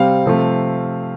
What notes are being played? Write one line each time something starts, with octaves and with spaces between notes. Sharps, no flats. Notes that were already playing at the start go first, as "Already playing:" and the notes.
Already playing: C3 G3 C4 F5
C3 F3 A3